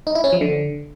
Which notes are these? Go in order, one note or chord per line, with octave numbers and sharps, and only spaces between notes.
D#4
E4
C#4
F3
D3